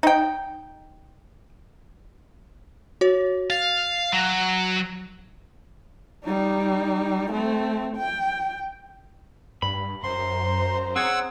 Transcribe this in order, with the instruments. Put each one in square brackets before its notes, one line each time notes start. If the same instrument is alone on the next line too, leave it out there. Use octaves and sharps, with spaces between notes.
[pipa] D#4 G5
[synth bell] F#4 C#5
[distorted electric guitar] F5 [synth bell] A6
[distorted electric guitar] F#3
[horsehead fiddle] G3 D#4
A3 C4
G5
[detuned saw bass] G2 [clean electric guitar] B5
[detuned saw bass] F#2 [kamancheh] C5 A#5 [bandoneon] C6
[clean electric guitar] C4 G#4 C#5 [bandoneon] F#5 E6